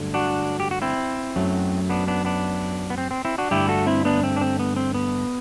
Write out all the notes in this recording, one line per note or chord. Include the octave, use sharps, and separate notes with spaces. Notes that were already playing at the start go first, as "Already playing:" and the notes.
Already playing: G2 D3 F#3 A3
D4 F#4
G4
F#4
C4 E4
F#2 F#3 A3
B3 D4
B3 D4
B3 D4
B3
C4
C4
C4 E4
D4 F#4
G2 D3 A3 E4 G4
F#4 A4
C4 E4
B3 D4
C4
D4
C4
B3
C4
B3